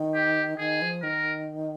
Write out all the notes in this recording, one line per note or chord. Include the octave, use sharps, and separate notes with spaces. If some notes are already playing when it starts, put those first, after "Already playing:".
Already playing: D#3
G4
D#3 G#4
F3
D#3 A#4